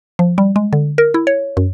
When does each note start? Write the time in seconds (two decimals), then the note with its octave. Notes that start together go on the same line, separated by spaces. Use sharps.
0.19 F3
0.38 G3
0.56 G#3
0.73 D3
0.98 A#4
1.14 E4
1.27 C#5
1.57 F#2